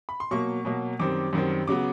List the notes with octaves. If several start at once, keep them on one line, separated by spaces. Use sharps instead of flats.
B5
C6
B2 F#3 A#3 C#6
B2 F#3 A#3
F#2 D#3 G3 C4 D6
F#2 D#3 G3 C4
C#3 F#3 B3 D6